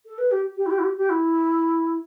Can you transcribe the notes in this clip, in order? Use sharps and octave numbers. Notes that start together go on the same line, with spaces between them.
A4
B4
G4
G4
E4
G4
E4
G4
G4
E4